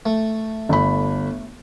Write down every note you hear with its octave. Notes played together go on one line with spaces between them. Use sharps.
A3
G1 B5